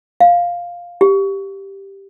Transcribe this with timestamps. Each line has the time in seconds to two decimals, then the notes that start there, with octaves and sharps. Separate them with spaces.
0.20 F5
1.01 G4